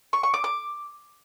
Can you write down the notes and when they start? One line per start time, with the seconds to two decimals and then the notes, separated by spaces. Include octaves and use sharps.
0.13 C#6
0.23 C#6
0.34 D6
0.44 D6